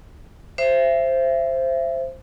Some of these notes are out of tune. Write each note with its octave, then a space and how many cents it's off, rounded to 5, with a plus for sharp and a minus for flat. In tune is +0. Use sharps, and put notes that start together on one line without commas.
C5 +5 E5 +30